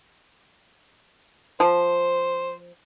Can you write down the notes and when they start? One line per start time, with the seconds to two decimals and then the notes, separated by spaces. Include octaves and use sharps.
1.60 F3 C5